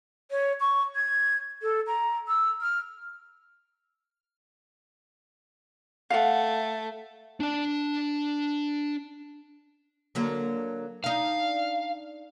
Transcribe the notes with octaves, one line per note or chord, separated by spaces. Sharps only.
C#5
C#6
G#6
A4
A#5
E6
F6
A3 F5 F#5
D4 A5
D3 F#3 A#3
D4 D#4 F5